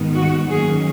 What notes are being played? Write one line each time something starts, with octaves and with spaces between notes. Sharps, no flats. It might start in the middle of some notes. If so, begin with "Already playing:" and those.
Already playing: G#2 D#3 G#3 B3
F#4
F#2 D#3 A#3 C#4 G#4